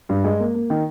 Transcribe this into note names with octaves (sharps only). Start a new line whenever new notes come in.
G2
G#3
A#3
A#3
D#3